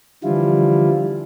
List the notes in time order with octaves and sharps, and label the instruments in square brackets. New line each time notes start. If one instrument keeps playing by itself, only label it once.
[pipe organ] D3 E3 F3 G3 E4 F4